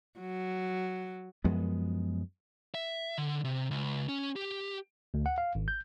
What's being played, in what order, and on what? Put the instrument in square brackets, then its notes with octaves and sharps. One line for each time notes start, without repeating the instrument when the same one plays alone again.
[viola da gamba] F#3
[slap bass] F#2 F3 G#3 B3
[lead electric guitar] E5
D3
C3
C#2
C#4
G4
[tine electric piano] D2
F#5
F5
G#1
G6